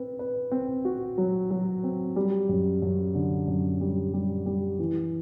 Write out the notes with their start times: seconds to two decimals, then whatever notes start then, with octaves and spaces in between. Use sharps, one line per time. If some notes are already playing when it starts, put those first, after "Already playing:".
Already playing: C4 B4
0.19 B4
0.51 C4
0.85 F#4
1.18 F#3
1.51 F#3
1.84 C4
2.16 G3
2.49 F#2
2.82 F#2
3.15 D3
3.48 F#2
3.81 G3
4.14 G3
4.46 G3
4.79 E3